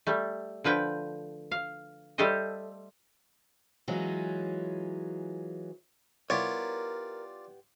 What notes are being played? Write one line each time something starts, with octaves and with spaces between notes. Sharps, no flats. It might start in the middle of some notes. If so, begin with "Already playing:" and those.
G3 A3
D3 F3 B4 G5
F5
G3 A3 G4 A4 C5 D#5
E3 F#3 G#3 C#4 F4
G3 B3 E4 F4 A#4 C#5 D5